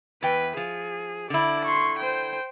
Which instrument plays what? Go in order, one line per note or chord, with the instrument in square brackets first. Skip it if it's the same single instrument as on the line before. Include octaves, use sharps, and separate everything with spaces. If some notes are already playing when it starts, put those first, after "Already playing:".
[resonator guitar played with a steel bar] E2 G5 [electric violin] B4
[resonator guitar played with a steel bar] F3 [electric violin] G#4
[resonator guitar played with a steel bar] D3 E4 [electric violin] D5
[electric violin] C6 C#6
C5 G5